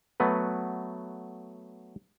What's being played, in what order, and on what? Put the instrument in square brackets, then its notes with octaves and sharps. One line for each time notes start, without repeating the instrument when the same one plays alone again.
[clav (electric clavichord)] F#3 A3 B3 B4